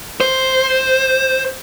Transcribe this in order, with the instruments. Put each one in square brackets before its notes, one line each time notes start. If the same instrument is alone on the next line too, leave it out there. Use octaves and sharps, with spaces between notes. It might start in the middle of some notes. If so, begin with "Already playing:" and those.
[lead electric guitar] C5